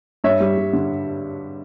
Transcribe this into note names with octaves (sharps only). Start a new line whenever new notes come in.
G2 C#5 E5
G3
G3
D3